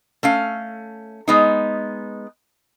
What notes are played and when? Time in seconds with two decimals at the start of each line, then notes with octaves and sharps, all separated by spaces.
0.23 A3 C#4 F5
1.28 G#3 B3 D#4